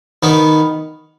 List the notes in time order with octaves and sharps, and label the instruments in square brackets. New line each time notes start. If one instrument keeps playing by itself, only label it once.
[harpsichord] D#3 B3 D#4